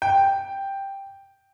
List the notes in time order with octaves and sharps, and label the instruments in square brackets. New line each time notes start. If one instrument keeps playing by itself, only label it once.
[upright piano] G5